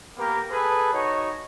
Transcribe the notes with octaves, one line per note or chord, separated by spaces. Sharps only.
A#3 B3 G4 A#4
G#4 A4 B4
D#4 F#4 C#5